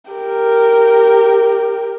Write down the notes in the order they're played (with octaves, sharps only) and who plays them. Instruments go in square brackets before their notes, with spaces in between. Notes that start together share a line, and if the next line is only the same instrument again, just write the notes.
[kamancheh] G4 A#4